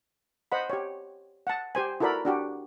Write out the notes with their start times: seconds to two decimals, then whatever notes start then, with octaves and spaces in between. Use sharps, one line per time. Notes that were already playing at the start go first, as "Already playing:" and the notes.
0.52 C5 D#5 F#5 B5
0.70 G4 C#5
1.47 F#5 A5
1.75 G4 C5 G#5
2.00 E4 F#4 A4 A#4 D5 B5
2.25 D4 F#4 G4